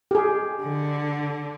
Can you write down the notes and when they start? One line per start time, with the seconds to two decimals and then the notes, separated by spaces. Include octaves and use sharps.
0.11 G4 G#4
0.61 D3